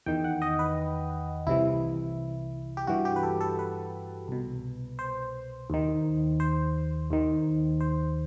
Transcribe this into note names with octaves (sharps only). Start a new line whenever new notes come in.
E2 D#3 G5
F#5
D#5
B4
C2 C3 E3 E4
G4
G2 E3 F#4
G4
B4
A4
A4
B4
C2 B2
C5
D#2 D#3
C5
D#2 D#3
C5